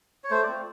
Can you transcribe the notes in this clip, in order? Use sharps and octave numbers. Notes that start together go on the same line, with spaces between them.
C#5
A3 C5
D5
C4 F4